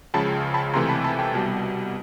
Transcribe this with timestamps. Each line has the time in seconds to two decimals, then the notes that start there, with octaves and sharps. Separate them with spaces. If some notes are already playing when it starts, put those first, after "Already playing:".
0.14 C#2 C#3 F3 A5 B5
0.54 A5 B5
0.73 C#2 C3 E3 A3 A#5 C6
0.89 A5 B5
1.04 A5 B5
1.19 G5 A5
1.34 C2 B2 G3